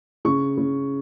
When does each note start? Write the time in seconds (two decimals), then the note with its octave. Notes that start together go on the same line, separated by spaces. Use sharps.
0.25 C#3 C#6
0.57 C#3